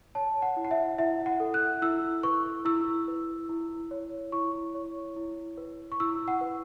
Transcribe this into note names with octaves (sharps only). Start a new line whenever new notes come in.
C#5 A5
F#5
E4
F#5
E5
E4 E5
F#5
A4
F#6
E4 E6
B4 C#6
E4 E6
B4
E4
C#5
E4 C#6
C#5
E4
B4
C#6
E4 E6
F#5
B4